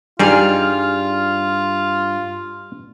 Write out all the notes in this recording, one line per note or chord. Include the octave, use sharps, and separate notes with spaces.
G2 G3 D#4 F4 G#4 F6